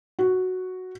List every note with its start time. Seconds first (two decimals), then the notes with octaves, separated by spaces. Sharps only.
0.19 F#4